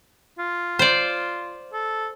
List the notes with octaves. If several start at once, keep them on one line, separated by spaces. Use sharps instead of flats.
F4
C5 D5
A4